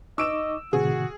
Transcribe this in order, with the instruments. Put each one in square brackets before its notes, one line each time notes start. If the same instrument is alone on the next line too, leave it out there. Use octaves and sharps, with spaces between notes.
[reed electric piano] D#4 C#6 D6 [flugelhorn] D#5 [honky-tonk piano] E6 D7 E7
[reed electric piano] A2 C3 D#3 [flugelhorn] F#4 [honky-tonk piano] G#4